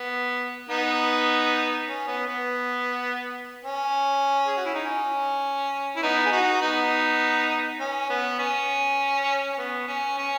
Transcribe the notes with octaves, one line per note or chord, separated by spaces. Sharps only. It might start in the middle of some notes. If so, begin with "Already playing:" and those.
Already playing: B3
B3 D#4
C#4
B3
B3
C#4
G#4
F#4
E4
D#4
C#4
E4
B3 D#4
G#4
D#4 F#4
B3 D#4
C#4
B3
C#4
C#4
B3
C#4
C#4